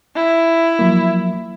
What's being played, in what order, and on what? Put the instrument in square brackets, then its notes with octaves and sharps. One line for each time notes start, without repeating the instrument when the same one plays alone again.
[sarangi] E4
[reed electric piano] F3 F#3 A#3